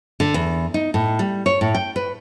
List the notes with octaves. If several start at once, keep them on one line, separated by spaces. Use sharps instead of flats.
D3
E2
D#4
A2
G3
C#5
A2
G5
B4